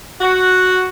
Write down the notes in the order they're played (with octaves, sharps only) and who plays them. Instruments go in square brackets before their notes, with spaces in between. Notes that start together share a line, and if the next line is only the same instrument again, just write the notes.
[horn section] F#4